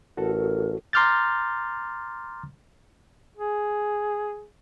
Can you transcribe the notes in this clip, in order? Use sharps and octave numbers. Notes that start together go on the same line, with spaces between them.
A1 F#4 A4 A#4
A#5 C6 D6 F6 G6 A6
G#4